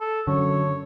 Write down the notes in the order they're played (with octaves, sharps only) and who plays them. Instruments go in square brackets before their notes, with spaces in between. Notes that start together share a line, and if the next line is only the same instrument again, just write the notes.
[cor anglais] A4
[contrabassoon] F#2 [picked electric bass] D3 [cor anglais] C#5